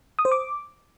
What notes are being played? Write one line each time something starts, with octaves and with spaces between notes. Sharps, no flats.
D#6
C5
D6